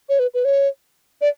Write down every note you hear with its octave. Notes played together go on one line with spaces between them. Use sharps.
C#5
B4
B4
C#5
D5